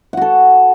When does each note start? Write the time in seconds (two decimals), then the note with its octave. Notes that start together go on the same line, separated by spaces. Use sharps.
0.13 F#5
0.17 F#4
0.21 A4